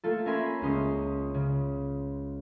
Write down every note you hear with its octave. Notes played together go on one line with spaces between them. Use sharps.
A3 A#3 F4 A4
C#4 A#4 E5 G#5 B5 C6
C#2 G#3 C#4 C6 D#6
C#3